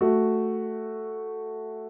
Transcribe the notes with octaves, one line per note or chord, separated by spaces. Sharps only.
A3 F#4